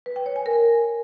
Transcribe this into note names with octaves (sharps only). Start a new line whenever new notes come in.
B4
G5
C#5
G#5
A#4